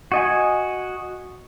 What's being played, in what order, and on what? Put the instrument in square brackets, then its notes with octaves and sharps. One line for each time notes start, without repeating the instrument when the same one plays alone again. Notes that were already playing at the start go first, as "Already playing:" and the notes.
[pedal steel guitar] F#4 D#5 G#5